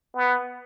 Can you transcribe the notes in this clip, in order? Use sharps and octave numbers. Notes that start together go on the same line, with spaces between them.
B3